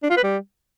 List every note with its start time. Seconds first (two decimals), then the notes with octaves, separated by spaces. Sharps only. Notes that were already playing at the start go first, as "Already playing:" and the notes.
0.03 D4
0.10 F4
0.17 B4
0.24 G3